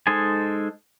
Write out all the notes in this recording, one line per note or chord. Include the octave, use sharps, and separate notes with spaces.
G#3 D#4 A4 C5 G#5